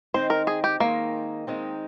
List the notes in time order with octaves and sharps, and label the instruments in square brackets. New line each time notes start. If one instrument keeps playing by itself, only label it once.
[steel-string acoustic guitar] D#3 G#3 C4 D#4 [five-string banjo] C5
[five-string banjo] A#4
G#4
G4
[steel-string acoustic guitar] D#3 G#3 C4 D#4 [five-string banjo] A#3
[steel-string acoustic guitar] D#3 G#3 C4 D#4